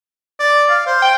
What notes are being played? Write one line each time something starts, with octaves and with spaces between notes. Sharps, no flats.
D5
F5
C5
G5